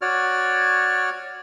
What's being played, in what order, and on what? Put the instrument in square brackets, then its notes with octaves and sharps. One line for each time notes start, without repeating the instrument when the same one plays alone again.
[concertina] F#4 C#5 D5 F6